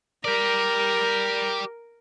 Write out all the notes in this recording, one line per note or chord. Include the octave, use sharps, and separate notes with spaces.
G4 A#4 D5